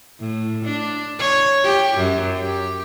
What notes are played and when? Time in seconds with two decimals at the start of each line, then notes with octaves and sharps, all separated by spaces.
0.20 A2
0.65 D4
1.19 C#5
1.64 G4
1.97 F#2
2.38 G4